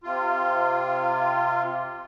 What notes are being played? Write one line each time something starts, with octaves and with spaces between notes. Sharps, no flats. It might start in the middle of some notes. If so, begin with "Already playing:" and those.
C3 F4